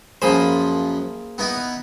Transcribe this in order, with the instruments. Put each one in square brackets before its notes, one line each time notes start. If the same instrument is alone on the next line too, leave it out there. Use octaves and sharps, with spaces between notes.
[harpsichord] F#2 F3 B5 [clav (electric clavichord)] A#3 G#4 C5
[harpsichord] B3 D#4 E4